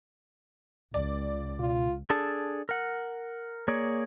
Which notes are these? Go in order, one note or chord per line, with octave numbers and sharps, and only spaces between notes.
C#2 D5
B2 F4
D4 G#4 A4 A5
A#4 F#5
A#3 G#4 C#5 D5